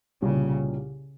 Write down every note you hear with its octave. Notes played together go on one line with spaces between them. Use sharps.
C2 A#2 C#3 G3 C#4